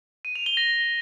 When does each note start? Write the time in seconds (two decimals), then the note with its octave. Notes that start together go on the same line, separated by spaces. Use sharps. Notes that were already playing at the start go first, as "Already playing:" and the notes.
0.25 D#7
0.35 F7
0.46 G7
0.57 A#6